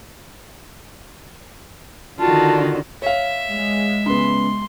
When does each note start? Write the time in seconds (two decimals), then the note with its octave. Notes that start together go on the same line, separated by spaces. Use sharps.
2.19 D3 D#3 F4 F#4 A5
3.02 C#5 E5 F5
3.50 G#3
4.06 C#3 B3 C6